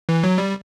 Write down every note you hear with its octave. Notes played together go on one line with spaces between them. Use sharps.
E3
F#3
G3